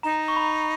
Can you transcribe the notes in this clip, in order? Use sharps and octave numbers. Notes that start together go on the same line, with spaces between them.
D#4 A#5
C#6
B5